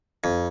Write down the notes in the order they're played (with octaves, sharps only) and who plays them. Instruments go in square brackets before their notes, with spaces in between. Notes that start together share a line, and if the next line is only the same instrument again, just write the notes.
[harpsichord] F2